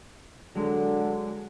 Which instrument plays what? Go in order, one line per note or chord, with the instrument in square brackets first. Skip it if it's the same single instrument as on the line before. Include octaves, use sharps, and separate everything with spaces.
[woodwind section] D3 [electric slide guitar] F#3 G#3